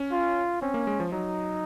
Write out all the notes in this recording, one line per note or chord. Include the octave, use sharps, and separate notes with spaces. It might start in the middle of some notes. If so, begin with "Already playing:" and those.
Already playing: C#4
F4
C4 C#4
A#3
G#3
F3
F#3 D#4